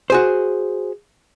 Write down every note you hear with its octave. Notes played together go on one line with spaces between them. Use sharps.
F#4 G#4 C5